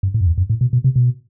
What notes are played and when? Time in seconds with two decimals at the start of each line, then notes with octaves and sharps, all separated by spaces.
0.03 G2
0.14 A2
0.21 F#2
0.26 E2
0.38 F#2
0.50 A2
0.61 B2
0.73 B2
0.84 C3
0.96 B2